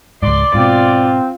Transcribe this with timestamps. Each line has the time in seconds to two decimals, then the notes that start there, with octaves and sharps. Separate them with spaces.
0.23 C#2 G#2 D5 C6
0.54 G#2 B2 C4 F4